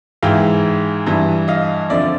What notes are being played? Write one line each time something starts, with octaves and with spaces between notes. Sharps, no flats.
G#2 E3 F5 G5
G2 E3
D#5 F5
F2 D3 F3 D5 E5